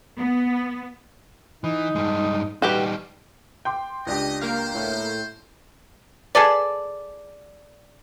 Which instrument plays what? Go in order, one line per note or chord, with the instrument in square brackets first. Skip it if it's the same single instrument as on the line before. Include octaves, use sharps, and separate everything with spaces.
[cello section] B3
[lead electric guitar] E3 [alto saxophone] D#4
[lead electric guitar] G2 G#3
[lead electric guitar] G3 D#4 [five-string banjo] F#4 G4 B4
[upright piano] G5 C6 D6
[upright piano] C#2 D4 G4 [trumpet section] D#5
[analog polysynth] A#3 A#4 F5 [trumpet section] C5
[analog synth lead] A2
[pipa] G#4 A4 B4 D5